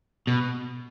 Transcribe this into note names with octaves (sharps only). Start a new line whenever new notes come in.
B2